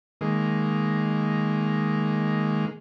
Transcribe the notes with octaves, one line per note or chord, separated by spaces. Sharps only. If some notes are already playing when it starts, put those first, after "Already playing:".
D#3 G#3 A#3